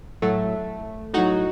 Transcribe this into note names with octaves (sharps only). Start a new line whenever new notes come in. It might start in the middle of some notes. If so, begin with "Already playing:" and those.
A2 F#3 A3
A2 F#3 D#4 F#4